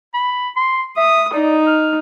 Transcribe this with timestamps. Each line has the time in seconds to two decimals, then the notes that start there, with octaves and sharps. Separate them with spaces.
0.14 B5
0.56 C6
0.97 E5 D#6
1.33 D#4 D5
1.67 F6